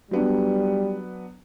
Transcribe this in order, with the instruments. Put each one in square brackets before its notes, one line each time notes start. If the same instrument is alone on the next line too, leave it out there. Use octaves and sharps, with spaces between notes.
[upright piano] F#3 B3 D4 [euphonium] G3